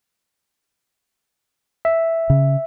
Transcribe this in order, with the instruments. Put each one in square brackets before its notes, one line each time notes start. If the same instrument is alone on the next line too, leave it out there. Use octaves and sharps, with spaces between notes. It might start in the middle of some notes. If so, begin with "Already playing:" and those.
[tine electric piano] E5
[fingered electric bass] C#3